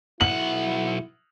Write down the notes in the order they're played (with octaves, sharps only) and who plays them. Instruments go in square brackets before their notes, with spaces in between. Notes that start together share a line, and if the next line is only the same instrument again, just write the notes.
[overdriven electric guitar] B1 F#5 [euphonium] E4 [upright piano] F#7